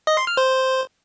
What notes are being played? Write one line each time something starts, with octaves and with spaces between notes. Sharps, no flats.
D#5
C6
F6
C5